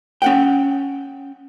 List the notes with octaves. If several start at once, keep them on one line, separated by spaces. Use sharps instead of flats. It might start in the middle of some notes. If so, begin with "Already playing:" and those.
C#4 F#5 G5